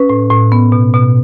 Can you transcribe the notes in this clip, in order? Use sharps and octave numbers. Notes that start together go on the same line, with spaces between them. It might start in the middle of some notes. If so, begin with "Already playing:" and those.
Already playing: C#4 B4
A2
A2
B3
B2
B2